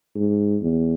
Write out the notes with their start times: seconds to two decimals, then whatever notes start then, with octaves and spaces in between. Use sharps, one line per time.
0.15 G#2
0.62 E2